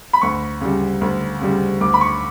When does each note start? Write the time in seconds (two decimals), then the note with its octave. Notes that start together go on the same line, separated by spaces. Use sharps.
0.13 B5
0.22 D2 C#6
0.61 C#3 G3
1.01 D2
1.41 C#3 G3
1.81 D2 D6
1.94 B5
2.01 C#6